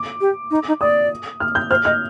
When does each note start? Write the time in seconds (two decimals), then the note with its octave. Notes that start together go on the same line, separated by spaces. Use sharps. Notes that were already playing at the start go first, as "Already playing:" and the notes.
Already playing: D6
0.21 G4
0.51 D#4
0.68 D#4
0.81 D5 D#6
1.40 F6
1.55 G6
1.70 C5 F6
1.85 D#5 F6